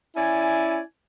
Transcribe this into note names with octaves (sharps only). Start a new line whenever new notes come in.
C#4 E4 D5 G#5